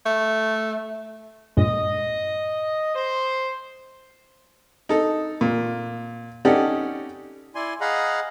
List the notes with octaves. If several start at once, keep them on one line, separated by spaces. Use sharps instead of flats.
A3
G2 A#2 G#3 D#5
C5
D#4 A4
A#2
C#4 D#4 G4 A4 D5 F#5
E4 D5 G#5 C6
G#4 D#5 F5 F#5 A#5 B5